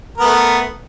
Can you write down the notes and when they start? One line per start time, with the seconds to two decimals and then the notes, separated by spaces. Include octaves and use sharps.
0.18 A#4
0.20 B3
0.23 A3